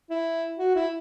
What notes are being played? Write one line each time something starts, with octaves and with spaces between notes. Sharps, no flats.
E4
F#4
E4